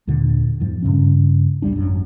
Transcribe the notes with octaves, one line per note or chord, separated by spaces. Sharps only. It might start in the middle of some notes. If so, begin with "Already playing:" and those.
D#2 A#2 D3
E2 G#2 F3
G2 C#3 C#4
A1 D#2 G3 D4
G#1 F#2 F#3